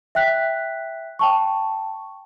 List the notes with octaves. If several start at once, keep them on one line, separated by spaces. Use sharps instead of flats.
E5 G5 F#6 B6
G5 A5 C#6